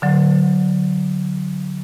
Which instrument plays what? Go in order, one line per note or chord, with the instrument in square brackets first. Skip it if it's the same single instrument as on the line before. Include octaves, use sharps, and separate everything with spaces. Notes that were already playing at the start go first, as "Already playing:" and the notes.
[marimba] D3 F#3